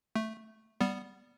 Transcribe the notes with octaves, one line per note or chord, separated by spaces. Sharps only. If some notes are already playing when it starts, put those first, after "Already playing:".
A3
G3 B3